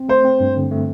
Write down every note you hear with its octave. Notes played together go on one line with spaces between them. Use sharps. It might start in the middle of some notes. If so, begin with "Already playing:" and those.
Already playing: C4
A3 C5
C4
G2
D3
A3